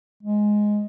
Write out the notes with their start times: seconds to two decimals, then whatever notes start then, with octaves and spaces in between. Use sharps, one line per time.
0.23 G#3